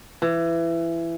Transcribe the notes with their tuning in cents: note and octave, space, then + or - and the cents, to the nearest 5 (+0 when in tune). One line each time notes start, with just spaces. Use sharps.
E3 +20